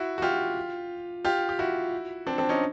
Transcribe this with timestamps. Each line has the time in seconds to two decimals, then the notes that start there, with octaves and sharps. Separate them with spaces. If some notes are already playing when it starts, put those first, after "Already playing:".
Already playing: E4 F#4
0.18 F#4
0.22 F4 G4
1.25 F4 G4
1.49 G4
1.59 E4 F#4
2.27 C4 D4
2.38 C4 D4
2.49 C#4 D#4